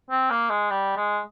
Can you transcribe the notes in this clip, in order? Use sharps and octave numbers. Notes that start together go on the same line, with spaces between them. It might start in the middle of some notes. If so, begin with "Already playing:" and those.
C4
A#3
G#3
G3
G#3